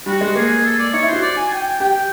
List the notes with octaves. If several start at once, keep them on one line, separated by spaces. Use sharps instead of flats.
G3 F#4
G#3
A#3 G#4
A4
D5
D#4 C#5
E4
C5
F#4
D5
G#5
G5
G4 G5